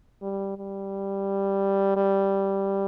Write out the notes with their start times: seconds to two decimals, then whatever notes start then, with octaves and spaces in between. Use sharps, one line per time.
0.22 G3
0.58 G3
1.96 G3